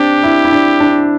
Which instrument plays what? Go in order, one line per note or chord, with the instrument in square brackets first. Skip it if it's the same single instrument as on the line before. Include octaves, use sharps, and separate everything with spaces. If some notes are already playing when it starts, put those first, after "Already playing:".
Already playing: [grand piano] C4 D4 [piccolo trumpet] G4
[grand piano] E4
E4
D4
D4